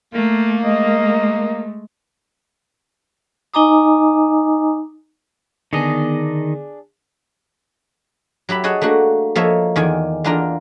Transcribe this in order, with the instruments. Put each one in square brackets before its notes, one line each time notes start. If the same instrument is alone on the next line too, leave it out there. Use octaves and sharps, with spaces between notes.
[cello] A3 [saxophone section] A#3
[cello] G#3 A3 [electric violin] D#5
[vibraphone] D#4 D#5 G#5 A#5 D6 D#6
[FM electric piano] D3 B3 [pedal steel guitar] D#3 D#5 [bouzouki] D4 G#4
[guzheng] F#3 G4 E5 B5
G#4 C#5 D#5 F#5 A5
A3 A#3 D4 F#4
F3 A#3 A4 C#5 D#5 E5
E2 D#3 D5 G#5
E2 A#3 D4 F4 A#4 A#5